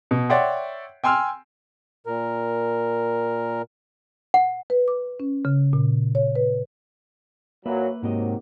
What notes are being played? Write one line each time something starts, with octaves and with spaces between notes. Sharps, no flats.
B2
C#5 D5 E5 F#5 G5 C6
G5 G#5 C6 E6 F6
A#2 A#4
F#5
B4
D6
C#4
C#3
A#2
C#5
B4
A#2 F#3 A#3 B4 E5
G#2 C3 D#3 F#3 A#3 D#5